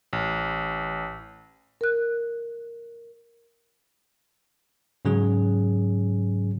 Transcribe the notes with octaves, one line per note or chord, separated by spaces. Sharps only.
A1
A#4 F#6
G#2 C#3 F#3 C#4 G#4